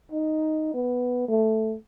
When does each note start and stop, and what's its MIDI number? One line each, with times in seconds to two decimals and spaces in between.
0.12 0.70 63
0.74 1.28 59
1.29 1.76 57